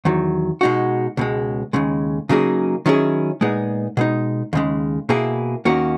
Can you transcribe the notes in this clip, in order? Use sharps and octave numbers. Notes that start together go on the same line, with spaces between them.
E2 D#3 F#3
B2 G#3 D#4 F#4
C#2 B2 G#3
D#2 C#3 G#3
C#3 F#3 A#3 D#4 G#4
D#3 F#3 C#4 E4 G#4
A#2 G#3 B3 D#4 G#4
B2 G#3 D#4
D#2 C#3 G#3
B2 A#3 E4 G#4
D#2 D#3 A#3 C#4 F#4